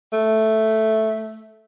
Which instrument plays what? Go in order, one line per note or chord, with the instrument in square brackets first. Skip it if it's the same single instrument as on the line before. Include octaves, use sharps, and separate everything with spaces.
[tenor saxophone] A3